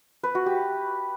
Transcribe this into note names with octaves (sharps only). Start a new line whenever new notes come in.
B4
F#4
G4